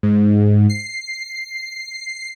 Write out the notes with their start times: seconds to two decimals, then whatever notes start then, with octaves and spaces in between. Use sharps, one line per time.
0.03 G#2
0.69 C7